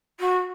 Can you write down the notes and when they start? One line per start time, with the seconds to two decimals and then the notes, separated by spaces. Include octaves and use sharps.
0.20 F#4